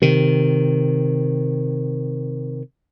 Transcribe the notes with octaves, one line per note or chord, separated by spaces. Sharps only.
C3 D#3